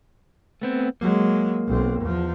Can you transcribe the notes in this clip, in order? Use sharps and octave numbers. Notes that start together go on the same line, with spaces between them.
A3 B3 C4
F#3 G#3 A#3
B1 C4
E2 F3